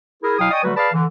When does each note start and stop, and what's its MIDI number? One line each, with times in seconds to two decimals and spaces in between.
0.23 0.38 64
0.23 0.38 68
0.23 0.38 70
0.39 0.49 47
0.39 0.49 54
0.39 0.49 64
0.39 0.49 77
0.39 0.49 79
0.39 0.49 87
0.51 0.61 74
0.51 0.61 75
0.51 0.61 79
0.51 0.61 80
0.51 0.61 85
0.51 0.61 87
0.64 0.71 50
0.64 0.71 54
0.64 0.71 55
0.64 0.71 57
0.64 0.71 66
0.64 0.71 71
0.76 0.88 68
0.76 0.88 71
0.76 0.88 74
0.76 0.88 77
0.76 0.88 81
0.76 0.88 83
0.93 1.05 50
0.93 1.05 52